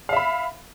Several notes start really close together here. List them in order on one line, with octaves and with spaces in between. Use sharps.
F5 E5 B5